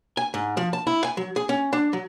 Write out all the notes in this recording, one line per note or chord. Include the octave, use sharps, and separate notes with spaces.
G#5
G#2
F3
A5
E4
G#5
F#3
G#4
C#4
D4
F#3